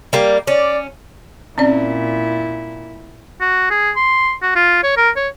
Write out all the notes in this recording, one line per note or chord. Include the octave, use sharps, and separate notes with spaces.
G3 A#3
C#4 D5
A#2 C4 C#4 E4 D5
F#4
G#4
C6
F#4
F4
C#5
A#4
C#5